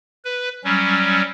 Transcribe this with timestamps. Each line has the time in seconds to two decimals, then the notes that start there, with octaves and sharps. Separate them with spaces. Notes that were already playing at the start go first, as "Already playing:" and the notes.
0.25 B4
0.64 F#3 G3 C#4